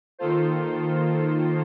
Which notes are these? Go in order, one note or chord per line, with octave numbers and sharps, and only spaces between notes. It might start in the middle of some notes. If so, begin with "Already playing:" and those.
D#3 A#3 F4 A4 C5